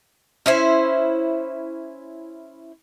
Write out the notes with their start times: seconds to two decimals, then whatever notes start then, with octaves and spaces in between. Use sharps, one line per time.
0.46 C#4 E4 C5